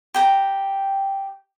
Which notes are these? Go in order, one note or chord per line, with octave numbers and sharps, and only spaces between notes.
G4 G5 A#5